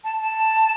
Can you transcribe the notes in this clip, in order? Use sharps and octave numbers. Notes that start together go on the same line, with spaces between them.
A5
A5